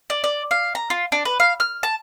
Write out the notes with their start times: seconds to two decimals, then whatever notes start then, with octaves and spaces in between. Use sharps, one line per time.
0.10 D5
0.24 D5
0.51 F5
0.75 A#5
0.90 F4
1.12 D4
1.25 B4
1.40 F5
1.60 F6
1.83 A5